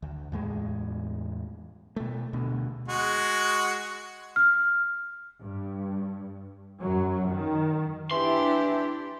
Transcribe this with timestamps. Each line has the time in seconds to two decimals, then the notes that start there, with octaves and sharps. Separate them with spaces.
0.02 D2
0.32 E2 A2 G#3
1.96 B2 A3
2.33 D2 B2
2.88 G#3 F#4
4.36 F6
5.41 G2
6.80 F#2 F#3
7.28 D#3
8.11 E3 D4 E4 G4 C6